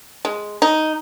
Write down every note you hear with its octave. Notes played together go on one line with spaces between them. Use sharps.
G#3
D#4